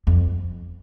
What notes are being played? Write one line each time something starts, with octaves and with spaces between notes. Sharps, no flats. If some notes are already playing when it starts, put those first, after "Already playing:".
F2